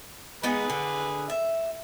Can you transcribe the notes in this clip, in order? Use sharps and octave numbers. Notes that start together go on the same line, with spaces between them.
G#3 B3 D#4 G#4 B4
D3
E5